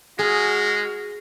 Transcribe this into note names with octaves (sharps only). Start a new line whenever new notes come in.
G#3 F#4 G#4 F6